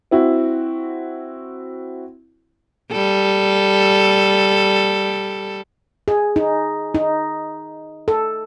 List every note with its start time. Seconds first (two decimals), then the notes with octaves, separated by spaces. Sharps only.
0.11 C4 E4 F#4
2.91 G3 A4
6.08 G#4
6.36 D#4
6.95 D#4
8.08 A4